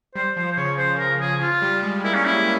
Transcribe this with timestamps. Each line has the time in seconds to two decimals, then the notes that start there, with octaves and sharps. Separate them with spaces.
0.15 G3 C5
0.37 F3 C5
0.52 C5
0.57 C#3 C#5
0.78 C#3 C5
0.99 A#4
1.20 G#4
1.41 F3 F4
1.62 G3
1.83 G#3
2.04 A#3 E4
2.14 C#4
2.25 C#4 E4